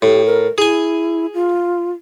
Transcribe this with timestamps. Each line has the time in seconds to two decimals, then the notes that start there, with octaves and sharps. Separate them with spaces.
0.02 A2 G4
0.26 A#4
0.58 E4 G#4 G#5
1.34 F4